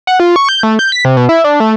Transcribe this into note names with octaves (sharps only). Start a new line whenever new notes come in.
F#5
F4
C#6
G6
A3
G6
B6
C3
B2
E4
D4
A3